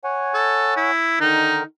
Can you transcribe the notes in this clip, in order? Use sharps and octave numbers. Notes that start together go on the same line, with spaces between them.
C#5 F#5 G#5
A4
E4
D3 D#3 D#4 A#4